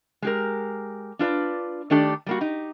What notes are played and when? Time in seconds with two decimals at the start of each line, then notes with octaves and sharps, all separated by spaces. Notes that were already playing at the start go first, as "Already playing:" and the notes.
0.22 G#3 G4 A#4
1.19 D4 F4 B4 D5
1.90 D#3 A3 D4 G4 A4 D5
2.26 G3 A#3 F#4
2.41 D#4 G4